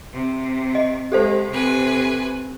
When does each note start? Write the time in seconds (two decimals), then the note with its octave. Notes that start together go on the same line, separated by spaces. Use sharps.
0.13 C3
0.75 D#5
1.12 G#3 G4 A4 C5
1.50 C3 B4 G#5